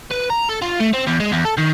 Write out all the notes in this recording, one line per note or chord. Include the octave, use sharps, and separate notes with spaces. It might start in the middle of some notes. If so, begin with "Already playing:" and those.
B4
A#5
A4
F4
A3
C4
E2
G#3
E2
A4
D#3